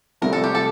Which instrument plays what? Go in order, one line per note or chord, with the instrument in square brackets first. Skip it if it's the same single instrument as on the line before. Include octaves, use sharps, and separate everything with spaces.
[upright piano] C2 C3 F3 A3 [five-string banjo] A#4
[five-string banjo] A4
G4
A4